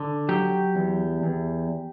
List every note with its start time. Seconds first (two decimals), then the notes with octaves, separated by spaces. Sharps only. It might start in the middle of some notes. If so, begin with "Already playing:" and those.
Already playing: D3
0.29 F#3 G4
0.75 E2
1.23 E2